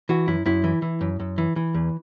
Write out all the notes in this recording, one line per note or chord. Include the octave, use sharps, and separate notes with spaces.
E3 F#4
F#2 E4
F#2 E4
E3
E3
F#2
F#2
E3
E3
E2